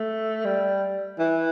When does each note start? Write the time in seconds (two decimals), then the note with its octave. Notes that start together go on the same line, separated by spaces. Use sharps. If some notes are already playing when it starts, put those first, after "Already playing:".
Already playing: A3
0.45 G3
1.19 E3